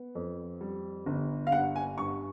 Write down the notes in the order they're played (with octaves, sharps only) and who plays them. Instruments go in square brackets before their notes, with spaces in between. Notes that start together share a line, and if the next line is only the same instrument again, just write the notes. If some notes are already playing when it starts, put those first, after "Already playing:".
Already playing: [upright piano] B3
F2
G3
G1
F5
G2 F#5
G#5
G2 C#6